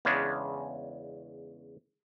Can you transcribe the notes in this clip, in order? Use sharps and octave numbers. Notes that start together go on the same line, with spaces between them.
E2 C#3 G#3 C#4 D4